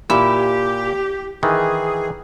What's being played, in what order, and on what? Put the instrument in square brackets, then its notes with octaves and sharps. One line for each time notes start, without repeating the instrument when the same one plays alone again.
[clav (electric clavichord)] A#2 [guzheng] E4 [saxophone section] G4
[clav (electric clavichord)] D#3 E3 [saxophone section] G#4